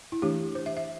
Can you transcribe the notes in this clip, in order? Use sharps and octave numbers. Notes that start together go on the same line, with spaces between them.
E4
E3 A3 D4 G4
C5
E5
E5